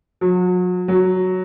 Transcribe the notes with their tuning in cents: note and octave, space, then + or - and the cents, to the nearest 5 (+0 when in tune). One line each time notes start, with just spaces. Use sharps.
F#3 -35
F#3 +0